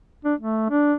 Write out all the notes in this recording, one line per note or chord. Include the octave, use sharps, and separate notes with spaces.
D4
A3
D4